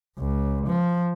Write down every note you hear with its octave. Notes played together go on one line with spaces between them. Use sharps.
C#2
F3